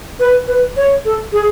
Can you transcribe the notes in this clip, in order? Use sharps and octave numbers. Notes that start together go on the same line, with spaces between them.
B4
B4
C#5
A4
G#4